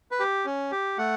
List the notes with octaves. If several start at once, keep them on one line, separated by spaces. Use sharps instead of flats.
B4
G4
C#4
G4
A3 F#5